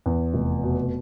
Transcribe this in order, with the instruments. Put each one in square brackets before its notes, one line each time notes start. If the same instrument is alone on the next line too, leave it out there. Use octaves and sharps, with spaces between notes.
[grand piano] E2
F1
B2